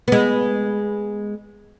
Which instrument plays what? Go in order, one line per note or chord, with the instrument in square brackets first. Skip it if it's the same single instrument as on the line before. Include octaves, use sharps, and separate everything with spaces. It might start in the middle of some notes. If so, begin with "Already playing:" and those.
[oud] G#3 B3